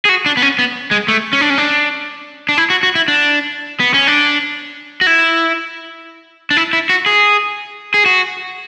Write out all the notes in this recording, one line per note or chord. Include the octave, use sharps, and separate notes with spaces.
G#4
F#4
D4
B3
C#4
B3
G#3
A3
C#4
D4
C#4
D4
D4
E4
F#4
F#4
E4
D4
B3
C#4
D4
F#4
E4
D4
E4
E4
F#4
G#4
G#4
F#4